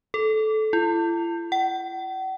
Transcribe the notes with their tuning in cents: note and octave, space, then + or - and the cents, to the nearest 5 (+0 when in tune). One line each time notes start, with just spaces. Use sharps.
A4 -15
E4 +40
F#5 +40